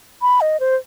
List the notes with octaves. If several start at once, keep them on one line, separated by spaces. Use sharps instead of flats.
B5
D#5
C5